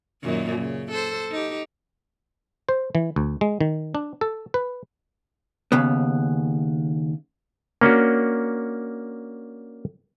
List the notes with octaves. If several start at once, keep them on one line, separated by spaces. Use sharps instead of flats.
F#2 A#2 D#3
C#3
A4 C5
D#4 G4
C5
E3
D2
G#3
D#3
D4
A4
B4
D#2 C#3 B3
A#3 C#4 D4 F#4